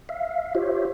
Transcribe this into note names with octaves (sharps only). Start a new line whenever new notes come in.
E5 F5
F4 G4 C5 C#5 E5